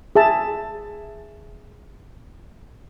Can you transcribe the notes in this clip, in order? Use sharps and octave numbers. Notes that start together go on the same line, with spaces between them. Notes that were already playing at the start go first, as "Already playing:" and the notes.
G#4 E5 A5